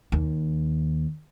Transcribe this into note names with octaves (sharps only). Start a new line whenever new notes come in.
D#2